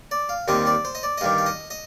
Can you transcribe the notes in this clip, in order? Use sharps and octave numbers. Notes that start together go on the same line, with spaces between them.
D5
F5
D#2 D#3 G3 C4 D#5
D5
C5
D#5
D5
D#5
G2 D#3 G3 F5
F5
D#5
D#5